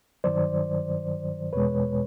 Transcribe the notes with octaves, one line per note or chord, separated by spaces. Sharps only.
G2 D#3 F#3 C5 D5
E2 B2 G#3 B4 C#5